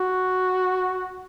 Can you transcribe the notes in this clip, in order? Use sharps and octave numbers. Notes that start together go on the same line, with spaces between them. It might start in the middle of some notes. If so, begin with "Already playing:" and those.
Already playing: F#4